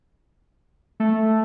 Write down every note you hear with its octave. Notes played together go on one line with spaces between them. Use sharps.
A3